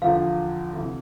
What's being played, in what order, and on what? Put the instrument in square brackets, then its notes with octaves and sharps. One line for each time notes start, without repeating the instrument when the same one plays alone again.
[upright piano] E2 D3 F3 [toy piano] F5
[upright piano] D2 C3 E3